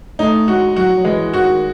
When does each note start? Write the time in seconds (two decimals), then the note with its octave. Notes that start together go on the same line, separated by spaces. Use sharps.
0.19 A3 D#4
0.48 G#3 F#4
0.76 F#3 F#4
0.98 F#3
1.05 E3 G#3
1.34 D#3 F#4